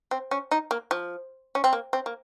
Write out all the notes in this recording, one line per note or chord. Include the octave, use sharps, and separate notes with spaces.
C4
C#4
D#4
A#3
F3
C#4
C4
A#3
C4
A#3